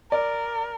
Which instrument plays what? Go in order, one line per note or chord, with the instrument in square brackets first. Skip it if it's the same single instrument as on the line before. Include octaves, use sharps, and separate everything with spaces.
[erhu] A#4 [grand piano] D5